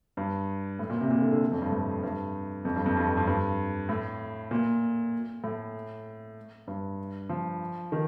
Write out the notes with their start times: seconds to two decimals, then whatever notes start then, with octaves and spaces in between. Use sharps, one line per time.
0.17 G2
0.79 A2
0.90 A#2
1.00 C3
1.11 A#2
1.21 D3
1.31 D3
1.52 F2
1.62 G2
1.72 A2
2.03 G2
2.65 F2
2.76 G2
2.86 F2
2.96 G2
3.06 F2
3.17 G2
3.27 G2
3.89 A2
4.51 A#2
5.44 A2
6.67 G2
7.29 F3
7.92 D#3